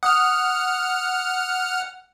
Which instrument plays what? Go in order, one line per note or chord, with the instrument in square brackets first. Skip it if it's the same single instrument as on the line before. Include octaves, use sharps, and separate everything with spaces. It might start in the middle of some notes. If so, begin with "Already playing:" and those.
[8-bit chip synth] F#5 F6 [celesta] D#6